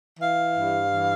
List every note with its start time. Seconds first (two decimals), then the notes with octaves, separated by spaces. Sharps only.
0.20 E3 F5
0.56 G2
0.91 E3